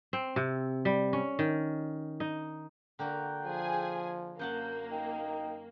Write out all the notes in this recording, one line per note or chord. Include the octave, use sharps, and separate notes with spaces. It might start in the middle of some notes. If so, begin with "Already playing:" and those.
C4
C3
G3
C#4
D#3
D#4
D3 A#3 F#4 G5
F3 G#4 G#5
F#2 A#3 F#5 A5 G6
D#4 G5